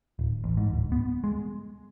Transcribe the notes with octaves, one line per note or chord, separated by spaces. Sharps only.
D1
A1
G#2
D1
B3
G#3